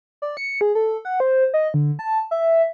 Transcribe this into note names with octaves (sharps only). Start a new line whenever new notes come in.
D5
C#7
G#4
A4
F#5
C5
D#5
D3
A5
E5